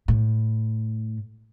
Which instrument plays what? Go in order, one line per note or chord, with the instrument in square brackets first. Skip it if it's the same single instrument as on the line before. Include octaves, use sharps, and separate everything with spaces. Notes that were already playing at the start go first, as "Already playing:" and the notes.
[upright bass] A2